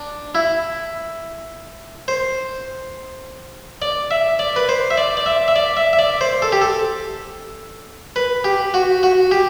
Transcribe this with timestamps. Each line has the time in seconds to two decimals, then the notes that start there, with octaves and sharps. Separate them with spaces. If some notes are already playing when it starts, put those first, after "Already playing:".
Already playing: D4
0.35 E4
2.08 C5
3.82 D5
4.11 E5
4.39 D5
4.56 B4
4.69 C5
4.91 E5
4.97 D5
5.17 D5
5.26 E5
5.48 E5
5.56 D5
5.77 E5
5.93 E5
5.99 D5
6.21 C5
6.42 A4
6.52 G4
6.61 A4
8.16 B4
8.44 G4
8.74 F#4
9.03 F#4
9.31 G4